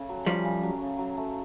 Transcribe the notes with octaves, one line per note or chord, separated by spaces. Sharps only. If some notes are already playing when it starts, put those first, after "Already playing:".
Already playing: C#3 A3
F#3
C#3 F3 G3
C#3
F#3
C#3
F#3
A3